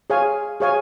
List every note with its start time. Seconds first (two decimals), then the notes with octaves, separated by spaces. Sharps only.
0.10 G#4 C#5 F5 G#5
0.60 G#4 C#5 F5 G#5